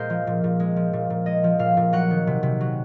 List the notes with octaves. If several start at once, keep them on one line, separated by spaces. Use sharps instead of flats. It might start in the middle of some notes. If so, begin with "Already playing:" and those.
Already playing: A#2 G#3 G#4 A#4 C5
F3
A#2
A#2
G#3
F3
A#2
A#2
G#3 D#5
F3
A#2 F5
A#2
F#3 F#5
D#3
C3
C3
F#3